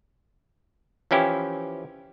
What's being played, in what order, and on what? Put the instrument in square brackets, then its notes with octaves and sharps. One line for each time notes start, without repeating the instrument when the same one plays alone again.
[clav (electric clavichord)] E3 F3 C#4 E4 G4